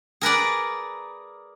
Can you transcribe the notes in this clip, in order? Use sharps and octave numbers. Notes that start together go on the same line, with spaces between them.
G#4 A#4 B4 D5